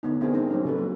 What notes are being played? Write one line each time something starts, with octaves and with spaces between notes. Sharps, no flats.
D3 B3 D#4
B3 C4 D4 G#4 A#4
G3 C4 D#4
F#3 G3 A#3 C#4 D#4
C#3 A4 B4
F#3 A#3